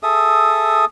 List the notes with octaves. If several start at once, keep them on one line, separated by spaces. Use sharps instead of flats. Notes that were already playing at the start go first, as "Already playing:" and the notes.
G#4 A4 E5 D#6